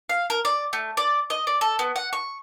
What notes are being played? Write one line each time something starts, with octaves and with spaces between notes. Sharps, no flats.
F5
A#4
D5
A3
D5
D#5
D5
A4
B3
F#5
C#6